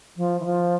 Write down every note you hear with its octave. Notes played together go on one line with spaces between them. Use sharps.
F3
E3
F3